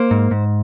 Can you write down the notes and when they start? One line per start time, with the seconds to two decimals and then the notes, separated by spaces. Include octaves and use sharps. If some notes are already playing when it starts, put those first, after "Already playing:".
Already playing: A#3 C5
0.11 G#2
0.31 G#2